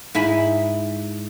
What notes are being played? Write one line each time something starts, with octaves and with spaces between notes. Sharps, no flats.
G#2 E4 G#5 B5